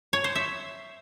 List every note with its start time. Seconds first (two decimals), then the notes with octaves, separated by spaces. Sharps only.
0.13 C#5
0.24 C5
0.35 E5